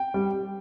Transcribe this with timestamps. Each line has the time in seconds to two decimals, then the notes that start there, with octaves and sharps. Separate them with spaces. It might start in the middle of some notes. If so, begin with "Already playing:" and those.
Already playing: G5
0.14 G3